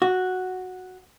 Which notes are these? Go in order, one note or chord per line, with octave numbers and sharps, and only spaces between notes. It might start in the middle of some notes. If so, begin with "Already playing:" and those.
F#4